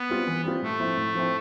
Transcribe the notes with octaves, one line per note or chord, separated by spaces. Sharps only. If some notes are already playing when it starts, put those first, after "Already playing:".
Already playing: B3
G3 C4 F4
E3
G3 C4 F4
A2 A3
F3 C4 E4
A2
F3 C4 E4